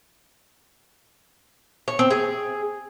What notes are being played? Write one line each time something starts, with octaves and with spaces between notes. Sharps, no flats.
C#5
C4
G#4